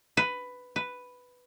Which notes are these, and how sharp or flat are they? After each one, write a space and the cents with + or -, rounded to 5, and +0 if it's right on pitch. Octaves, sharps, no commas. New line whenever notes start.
B4 +10
B4 +5